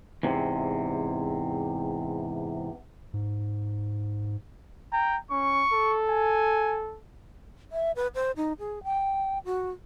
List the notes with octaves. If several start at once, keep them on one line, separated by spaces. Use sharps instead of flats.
E2 G#2 C3
G#2
G5 A#5
C#4 C#6
A4
G#5
E5
B4
C5
D#4
G#4
G5
F#4